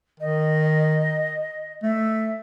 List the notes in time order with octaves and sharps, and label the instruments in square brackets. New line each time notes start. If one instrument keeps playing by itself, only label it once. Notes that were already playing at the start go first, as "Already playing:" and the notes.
[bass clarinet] D#3 [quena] D#5
[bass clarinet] A3 [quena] E5